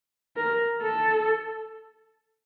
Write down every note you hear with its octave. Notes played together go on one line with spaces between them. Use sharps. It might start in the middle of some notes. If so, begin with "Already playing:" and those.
A#4
A4